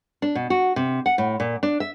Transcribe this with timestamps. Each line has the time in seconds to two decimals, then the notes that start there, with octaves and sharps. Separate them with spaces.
0.22 D4
0.35 B2
0.50 F#4
0.76 C3
1.06 F#5
1.18 A2
1.40 A#2
1.63 D4
1.80 E5